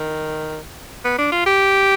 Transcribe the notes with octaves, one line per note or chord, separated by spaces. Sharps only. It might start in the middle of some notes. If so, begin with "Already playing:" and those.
Already playing: D#3
B3
D4
F4
G4